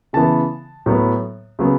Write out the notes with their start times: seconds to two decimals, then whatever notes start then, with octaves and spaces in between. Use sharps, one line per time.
0.13 C#3 E3 B3 A5
0.86 A2 F#3 B3
1.59 C#3 F#3 B3